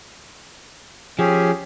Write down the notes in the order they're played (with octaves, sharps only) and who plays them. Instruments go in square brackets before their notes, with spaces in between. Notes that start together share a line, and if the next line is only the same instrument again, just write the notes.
[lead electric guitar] F3 [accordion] C#4 G4 G#4